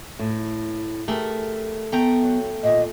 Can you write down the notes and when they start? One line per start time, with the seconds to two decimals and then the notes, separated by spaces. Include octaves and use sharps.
0.19 A2
1.08 A3 G4 G#4 A#4
1.92 A3 B3 G5 A#5
2.23 F#3
2.63 A#2 D#3 D#5